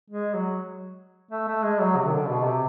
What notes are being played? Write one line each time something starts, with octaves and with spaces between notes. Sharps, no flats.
G#3
F#3
A3
A3
G#3
F#3
C3
D#3
D3
B2
C3